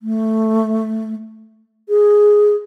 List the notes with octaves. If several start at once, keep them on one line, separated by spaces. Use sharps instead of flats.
A3
G#4